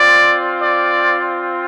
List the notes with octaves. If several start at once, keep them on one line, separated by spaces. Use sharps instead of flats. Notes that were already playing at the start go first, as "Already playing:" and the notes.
Already playing: C4 F4 D5
D5